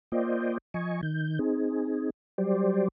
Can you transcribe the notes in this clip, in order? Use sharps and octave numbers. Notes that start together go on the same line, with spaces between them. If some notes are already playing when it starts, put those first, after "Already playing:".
A#3 F4 C5 D5 D#5 G5
F3 D#5 G#5 C#6
D#3 G6
C4 D#4 G#4
F#3 G3 G4 C5 D5